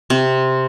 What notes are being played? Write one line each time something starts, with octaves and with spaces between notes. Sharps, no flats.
C3